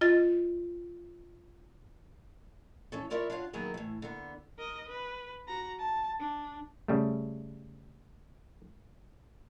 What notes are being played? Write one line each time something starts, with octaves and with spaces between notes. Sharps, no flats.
F4 D#5 A6
E3 C#4 A4
E4 F4 A#4 C#5 D5 E5
D4 F4 F#4 C#5 F5 F#5
D#3 F#3 A#3 B3 E4 G#4
A2 E3
D3 A#3 B3
A#4 D#5
B4
F#4 A#5
A5
D4
C#3 G3 A3